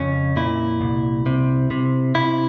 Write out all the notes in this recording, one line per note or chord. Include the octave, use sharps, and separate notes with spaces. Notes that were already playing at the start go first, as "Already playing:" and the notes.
Already playing: F2 C#3 C#4
A#2 E4
C2
C3
C3
C3 E4